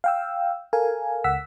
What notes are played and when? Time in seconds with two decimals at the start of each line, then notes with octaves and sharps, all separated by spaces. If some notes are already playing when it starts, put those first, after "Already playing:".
0.04 F5 G5 E6
0.73 A4 A#4 F5 G#5
1.24 C#2 F#5 E6 B6